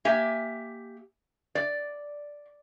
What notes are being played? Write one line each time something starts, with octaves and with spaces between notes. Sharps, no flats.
A#3 G4 E5 G#5
D5